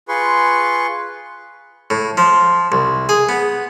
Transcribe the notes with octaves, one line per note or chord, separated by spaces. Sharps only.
F4 G#4 B4 C6 C#6
A2
F3
C2
G#4
B3